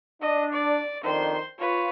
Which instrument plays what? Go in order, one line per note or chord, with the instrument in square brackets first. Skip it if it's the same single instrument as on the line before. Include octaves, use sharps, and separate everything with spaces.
[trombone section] D4 [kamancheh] D#5
[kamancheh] D5
[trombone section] F2 D#3 D4 [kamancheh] C5 C6
[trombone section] F4 [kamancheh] B4 C#5